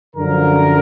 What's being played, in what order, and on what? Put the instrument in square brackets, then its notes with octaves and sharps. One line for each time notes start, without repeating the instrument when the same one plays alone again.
[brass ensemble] F#2 D3 F3 A#4